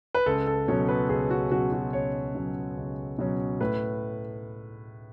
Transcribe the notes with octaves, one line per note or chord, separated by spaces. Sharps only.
B4
C#2 A4
A4
B2 F#3 C#4 C#5
B4
C#2 G#4
F#4
B2 F#3 C#4 F#4
F#4
C#2 C#5
B2 F#3 C#4
C#2
B2 F#3 C#4
A2 B4